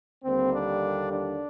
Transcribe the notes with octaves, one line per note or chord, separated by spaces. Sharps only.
D#2 D3 G3 A#3 C4
D4
D4